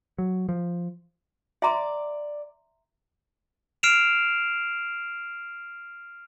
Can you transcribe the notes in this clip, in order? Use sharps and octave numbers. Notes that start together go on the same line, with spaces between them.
F#3
F3
D5 E5 A#5 C6 D6
F6 C7 D7 E7 F7